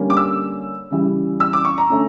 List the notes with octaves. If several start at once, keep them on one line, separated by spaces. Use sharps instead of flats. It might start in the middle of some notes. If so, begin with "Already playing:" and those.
Already playing: D3 G3 A#3 C#4
D6
E6
C#3 E3 G3
E6
D6
C#6
A#5
D3 A3 C#4